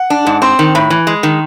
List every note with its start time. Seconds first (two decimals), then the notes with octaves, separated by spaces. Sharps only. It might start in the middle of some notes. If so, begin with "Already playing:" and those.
Already playing: F#5
0.10 D4
0.27 G#2
0.42 C4 C6
0.59 D#3
0.75 A2 B5
0.90 E3
1.07 G#3
1.23 D#3